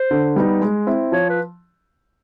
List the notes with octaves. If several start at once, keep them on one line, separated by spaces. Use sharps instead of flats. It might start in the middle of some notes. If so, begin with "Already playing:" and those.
Already playing: C5
D3
G3 B3 D#4
G#3
C4 E4
F3 C#5
B4